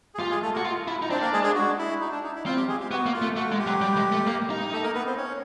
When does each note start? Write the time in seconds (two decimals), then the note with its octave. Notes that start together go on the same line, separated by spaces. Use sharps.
0.15 G#4
0.19 F4 G4
0.31 G#3 G#4
0.42 A3 A4
0.53 A#3 F#4 A#4
0.65 F4
0.88 E4
1.02 D#4
1.09 C4 D4 C5
1.21 A#3 A#4
1.33 G#3 G#4
1.43 G#3 G#4
1.55 F#4
1.79 E4
2.01 D#4
2.11 D4
2.23 D#4
2.35 E4
2.46 C4 F4
2.57 G4
2.68 G#3 G#4
2.80 G4
2.91 B3 F#4
3.06 A#3
3.14 F4
3.22 A3
3.36 A3 F#4
3.52 G#3
3.59 G4
3.67 F#3
3.82 G3
3.97 G#3
4.12 A3
4.27 A#3
4.50 D#4
4.72 A3 A4
4.83 A#3 A#4
4.95 B3 B4
5.06 C4 C5
5.17 C#4 C#5